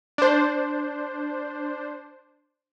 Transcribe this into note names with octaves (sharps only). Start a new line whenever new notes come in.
D4 C5